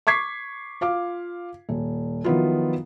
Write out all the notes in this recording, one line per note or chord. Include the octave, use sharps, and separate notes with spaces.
C#6 D6 G#6 B6 C7
F4 F5 D6
D#1
D#3 F3 F#3 B3 E4 F4